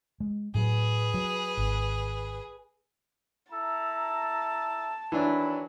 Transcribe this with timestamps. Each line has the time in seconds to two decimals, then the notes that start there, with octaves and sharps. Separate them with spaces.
0.20 G#3
0.54 A2 F#3 G#4 B4
1.14 F#3
1.57 G#1
3.52 E4 A4 A5 A#5
5.12 D#3 E3 F#3 D4 B5